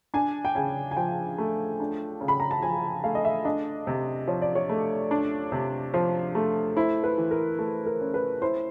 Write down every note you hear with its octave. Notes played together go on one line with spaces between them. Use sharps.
D4 G#5
G5
C#3 G#5
G#5
F3 G5
A3
D4
C#3
B5
A#5
A5
F3 G#5
A3 F5
D#5
E5
D4 D#5
C3
F3 C#5
D5
C#5
A3
D4
C3
F3 C5
A3
E4 C5
B4
E3
A#4
A3 A4
A#4
C#4
B4
E4 C5